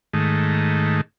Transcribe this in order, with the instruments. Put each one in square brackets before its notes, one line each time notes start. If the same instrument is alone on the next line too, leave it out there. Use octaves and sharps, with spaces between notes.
[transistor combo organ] G#2 D#3 A3